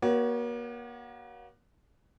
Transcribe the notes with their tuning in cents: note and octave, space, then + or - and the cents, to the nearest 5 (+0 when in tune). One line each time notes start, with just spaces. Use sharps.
A#3 +40 F#4 +25 C#5 +25